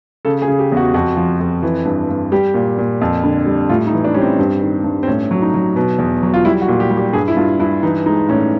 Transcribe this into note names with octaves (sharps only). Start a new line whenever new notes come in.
C#3 A4
G#4
C#3
G4
E2
F#4
F2 F#4
F3
F2
E3
G2
G2
G3 G4
A#2
A#2
F2
D3
G3
A2 F4
D#4
E3
D4
G3 C#4
C4
G2
D#3
G2
C4
A2 C#4
F#3
D#4
F#3
B2
E2
F#3
F4
G3 E4
F#4
A#2
G4
G3
G4
G2 G#4
E4
G2 F4
G2 E4
E3 D#4
G#3 D#4
A2 C#4